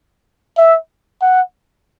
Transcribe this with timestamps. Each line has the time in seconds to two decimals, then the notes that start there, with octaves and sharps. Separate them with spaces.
0.57 E5
1.22 F#5